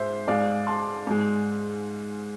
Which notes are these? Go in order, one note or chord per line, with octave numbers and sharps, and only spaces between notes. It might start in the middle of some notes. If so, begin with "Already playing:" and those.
Already playing: G#2 G#3 C5 E5
G#2 G#3 D5 F5
A5 C6
G#2 G#3